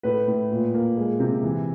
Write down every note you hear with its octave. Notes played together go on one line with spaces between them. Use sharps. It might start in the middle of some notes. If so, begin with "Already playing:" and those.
A2 B4
A2
A#2
A#3
G#3
C3
E3